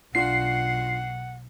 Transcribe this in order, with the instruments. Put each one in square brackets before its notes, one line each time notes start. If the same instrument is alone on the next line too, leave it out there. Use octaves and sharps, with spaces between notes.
[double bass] B1 [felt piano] D4 F4 [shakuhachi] F#5 [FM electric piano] C7